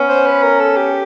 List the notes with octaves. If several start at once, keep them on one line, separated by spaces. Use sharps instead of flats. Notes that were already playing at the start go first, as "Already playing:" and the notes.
Already playing: B3 C#4
C5
B4
A#4
A4
G4